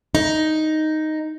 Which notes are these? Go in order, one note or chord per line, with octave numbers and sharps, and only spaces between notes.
D#4